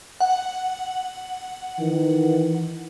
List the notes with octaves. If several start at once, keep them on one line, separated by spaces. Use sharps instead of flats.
F#5
D#3 E3